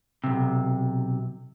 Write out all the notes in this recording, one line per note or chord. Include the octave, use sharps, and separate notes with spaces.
B1 C3